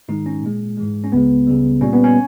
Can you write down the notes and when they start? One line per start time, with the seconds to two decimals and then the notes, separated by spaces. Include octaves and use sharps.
0.08 G#2 D#3 G#3 D#4
0.26 C#4
0.43 A#2 G#3
0.77 G#2 E3 G#3
1.04 C#4
1.12 C#2 C#3 G#3 B3
1.47 C#2 C#3 G3
1.81 A#2 G3 C#4
1.93 B3
2.04 C#4